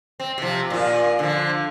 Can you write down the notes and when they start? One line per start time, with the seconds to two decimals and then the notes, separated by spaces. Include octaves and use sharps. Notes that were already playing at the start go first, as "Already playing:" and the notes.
0.20 C4
0.38 C3 F3
0.70 A#2 F4
1.19 D3 F3